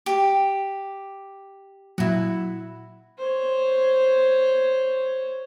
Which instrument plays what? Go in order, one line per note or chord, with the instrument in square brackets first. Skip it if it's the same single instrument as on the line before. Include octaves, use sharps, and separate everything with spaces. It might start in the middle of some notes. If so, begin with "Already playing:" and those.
[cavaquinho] G4
[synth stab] A#2 F#3 [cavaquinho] E4 F#4
[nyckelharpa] C5 C#5